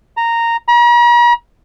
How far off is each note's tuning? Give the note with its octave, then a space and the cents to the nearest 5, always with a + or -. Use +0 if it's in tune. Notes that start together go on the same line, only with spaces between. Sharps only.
A#5 -10
A#5 +45